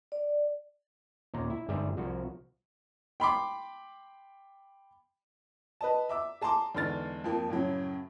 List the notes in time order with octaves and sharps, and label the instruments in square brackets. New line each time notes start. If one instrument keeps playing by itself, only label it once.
[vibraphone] D5
[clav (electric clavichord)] D#2 A#2 A#5
E4
G1 G#2 G3 G#4 D5 E5
C2 F3 F#4
[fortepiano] G5 B5 C6 D6
[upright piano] B4 D#5 A5
E5 D6 E6
G#4 A5 A#5 C6 D6
E2 G#2 D3 F6 A6
F2 F3 A#3
F#2 A2 C#3 F#3